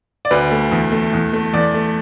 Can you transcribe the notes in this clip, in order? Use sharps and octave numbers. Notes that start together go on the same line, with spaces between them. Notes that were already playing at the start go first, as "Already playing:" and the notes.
D5
D2 B4
A3
E2
A3
E2
A3
E2 D5
A3